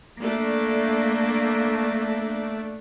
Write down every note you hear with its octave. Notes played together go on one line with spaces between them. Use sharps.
A3 A#3 D4